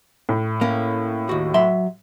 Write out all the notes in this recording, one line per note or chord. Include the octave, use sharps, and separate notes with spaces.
A2
A#3 C#4
D#2 F#4
F#3 E5 C6